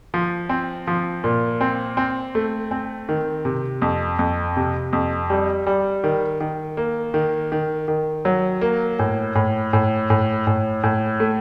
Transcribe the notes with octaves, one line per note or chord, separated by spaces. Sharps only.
F3
C4
F3
A#2
C4
C4
A3
C4
D#3
C3
F2
F2
C3
F2
G3
G3
D#3
D#3
A#3
D#3
D#3
D#3
F#3
A#3
A2
A2
A2
A2
A2
A2
A3